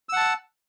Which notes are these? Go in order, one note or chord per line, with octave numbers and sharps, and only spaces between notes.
F#5 A5 E6